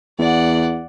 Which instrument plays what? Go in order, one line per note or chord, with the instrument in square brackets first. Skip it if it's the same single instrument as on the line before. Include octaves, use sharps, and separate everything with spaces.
[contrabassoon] E2 [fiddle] D5 F#5